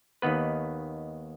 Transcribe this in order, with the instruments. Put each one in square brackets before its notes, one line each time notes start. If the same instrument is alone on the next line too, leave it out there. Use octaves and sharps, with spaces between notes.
[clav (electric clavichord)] D#2 D#3 B3 B4